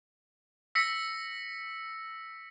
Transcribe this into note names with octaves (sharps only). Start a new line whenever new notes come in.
E6 A#6 B6 C#7